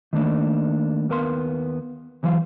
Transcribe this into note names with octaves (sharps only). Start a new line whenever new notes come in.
D#3 A3 A#3 D4
D#2 B3 A#4 F5 C6
E2 E3 F#3 F5